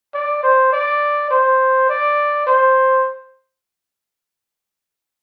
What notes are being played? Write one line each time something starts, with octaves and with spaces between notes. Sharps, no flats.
D5
C5
D5
C5
D5
C5